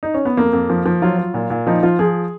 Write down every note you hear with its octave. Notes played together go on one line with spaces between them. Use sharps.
D#4
C#4
B3
F2 A#3
F2
F3
F3
F#3 F4
F#3
A#2
A#2
F3 D#4
F3 F4
F3 G#4